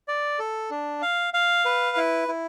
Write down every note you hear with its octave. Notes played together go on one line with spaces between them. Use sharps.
D5
A4
D4
F5
F5
B4
E4
E4